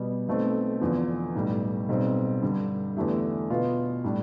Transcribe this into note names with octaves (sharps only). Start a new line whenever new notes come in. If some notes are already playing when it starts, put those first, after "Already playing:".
Already playing: B2 G3 B3
B1 B2 A3 C4
E2 D3 F3
B1 A2 G3
B1 B2 G3 C4
G2 D3 G3
E2 D3 A3 E4 G4
B2 B3 F4
A2 G3 D4